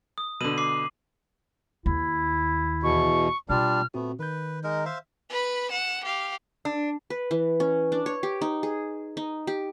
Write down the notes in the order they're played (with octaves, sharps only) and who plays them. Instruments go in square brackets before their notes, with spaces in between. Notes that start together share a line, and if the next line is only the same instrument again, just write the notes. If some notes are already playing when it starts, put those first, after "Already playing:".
[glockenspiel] D#6
[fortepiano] B2 D3 [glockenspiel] D#7 F#7
[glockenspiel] D6 C7
[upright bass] D#2 [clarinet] E4
[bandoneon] E2 B2 [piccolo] C#6
[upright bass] B2 [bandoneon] G3 D4 [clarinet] F4 [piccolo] F6
[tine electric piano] A#2 C4 F#4 [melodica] A3 B3
[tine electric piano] D#3 G6 [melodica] B4
[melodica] G#3 D#4 A#4
C5 E5 F5
[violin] B4 B5
F#5 E7
G4 F5
[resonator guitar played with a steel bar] D4
[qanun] B4
E3
C#4
D4
C#5
G4
D#4
G#4
D#4
G4